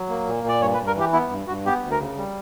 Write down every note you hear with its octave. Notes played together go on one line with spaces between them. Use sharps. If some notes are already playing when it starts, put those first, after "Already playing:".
Already playing: F#3
A#3
A#2
A#2
D5
G2 C#5
B4
G2
A#4
E3 G4
B3 E4
G2
G2 F#4
B3 G4
D2
A#4
C#3
G3